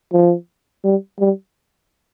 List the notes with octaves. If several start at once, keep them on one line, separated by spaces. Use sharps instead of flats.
F3
G3
G3